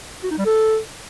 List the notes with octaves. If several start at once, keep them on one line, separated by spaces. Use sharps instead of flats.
F#4
D#4
G3
A4